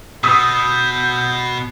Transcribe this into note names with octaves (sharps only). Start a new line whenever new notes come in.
B2 D#6 E6 G6 B6